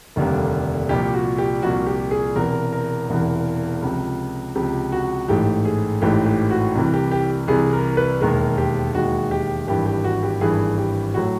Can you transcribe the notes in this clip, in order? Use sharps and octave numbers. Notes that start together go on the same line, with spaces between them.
F1 D#2 D3 G3 A#3
C2 A#2 F3 G4
F#4
G4
C2 A#2 F3 F#4
G4
G#4
E1 E2 C3 E3 A#4
A#4
E1 E2 C3 E3
C#2 C3 F3
C#2 C3 F3 G4
F#4
A1 G#2 E3 A3 G4
G#4
A1 G#2 E3 A3 G4
G4
F#4
C2 C3 E3
G4
G4
C2 C3 E3 G#4
A#4
B4
E1 D#2 D#3 G#3 A#4
G4
E1 D#2 D#3 G#3 F#4
G4
G#1 G2 E3 G4
G4
F#4
G4
G#1 G2 E3 G#4
G4
A2 F#3 A3 F#4